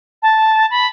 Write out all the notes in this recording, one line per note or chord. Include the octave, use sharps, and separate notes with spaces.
A5
B5